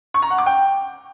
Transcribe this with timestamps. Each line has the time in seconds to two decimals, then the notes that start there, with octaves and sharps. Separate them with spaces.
0.14 C#6
0.22 A#5
0.30 F#5
0.38 D6
0.46 G5